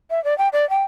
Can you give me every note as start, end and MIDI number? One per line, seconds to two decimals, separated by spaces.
0.10 0.22 76
0.24 0.37 74
0.38 0.48 79
0.53 0.68 74
0.70 0.84 79